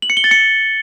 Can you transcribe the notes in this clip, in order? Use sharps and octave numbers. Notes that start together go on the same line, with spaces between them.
F#7
C#7
G7
A6
C#7